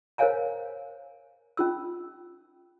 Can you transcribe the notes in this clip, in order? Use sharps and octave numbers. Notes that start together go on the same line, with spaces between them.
A#4 C5 C#5 F5 G#5 A#5
C#4 F4 E6